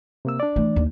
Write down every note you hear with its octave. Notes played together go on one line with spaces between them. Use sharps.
C3 A#3 E6
D4 D5
E3 A3
D#2